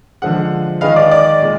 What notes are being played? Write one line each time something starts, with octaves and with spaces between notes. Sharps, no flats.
D3 F3 G#3 F#5
D#3 G#3 D#4 G#4 B4 F5
D5
D5
A#2 G#3